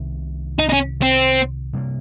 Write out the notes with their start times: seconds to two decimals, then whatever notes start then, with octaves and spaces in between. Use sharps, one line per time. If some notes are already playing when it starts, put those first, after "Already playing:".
Already playing: C2 C3 D#3
0.59 D#4
0.69 D#4
0.73 C#4
1.02 C4
1.73 C3 G3 A#3